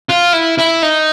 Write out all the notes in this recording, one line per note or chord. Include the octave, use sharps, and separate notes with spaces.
F4
E4
E4
D#4